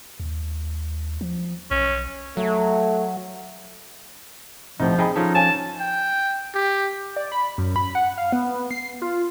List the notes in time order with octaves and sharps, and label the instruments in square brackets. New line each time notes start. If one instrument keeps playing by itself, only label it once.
[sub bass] D#2
F3
[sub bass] B1 [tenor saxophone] C#4
[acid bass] F#3 [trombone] A3
[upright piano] C2 [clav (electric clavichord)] A2 D#4 [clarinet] F3
[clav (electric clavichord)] D#4 [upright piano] G#4 G5 B5
[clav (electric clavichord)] F3 C#4 A4 [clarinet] D#4
[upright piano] C#5 F5 G#5 [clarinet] A5
[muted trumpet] G5
G4
[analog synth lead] D5
B5
F#2
B5
F#5
F5
B3
C7
F4